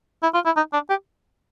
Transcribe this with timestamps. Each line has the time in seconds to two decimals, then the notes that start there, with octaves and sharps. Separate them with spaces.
0.23 E4
0.34 F4
0.45 E4
0.56 D#4
0.73 D4
0.89 G4